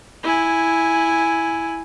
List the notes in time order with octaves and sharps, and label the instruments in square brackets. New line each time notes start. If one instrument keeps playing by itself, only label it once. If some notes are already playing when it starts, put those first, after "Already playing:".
[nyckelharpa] E4 G#5